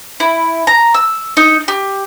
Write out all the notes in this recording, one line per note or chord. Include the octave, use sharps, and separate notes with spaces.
E4
A#5
E6
D#4
G4